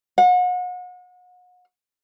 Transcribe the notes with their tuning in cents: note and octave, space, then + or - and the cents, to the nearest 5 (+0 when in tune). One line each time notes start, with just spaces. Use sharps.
F#5 -35